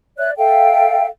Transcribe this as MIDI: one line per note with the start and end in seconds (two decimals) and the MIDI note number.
0.18 0.30 73
0.18 0.30 74
0.18 0.30 76
0.18 0.30 90
0.38 1.07 69
0.38 1.07 76
0.38 1.07 77
0.38 1.07 79